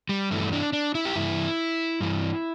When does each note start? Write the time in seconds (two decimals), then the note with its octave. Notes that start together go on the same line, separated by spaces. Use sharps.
0.09 G3
0.31 G2 E3 A3
0.53 D4
0.73 D4
0.95 E4
1.05 G4
1.16 G2 E3 E4
2.01 G2 E3